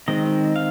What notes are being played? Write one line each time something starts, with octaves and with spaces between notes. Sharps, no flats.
D#3 G#3 C4 D#5
F5